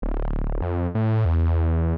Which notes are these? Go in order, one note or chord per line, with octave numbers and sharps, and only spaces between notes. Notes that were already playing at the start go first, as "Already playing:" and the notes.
D1
F2
A2
E2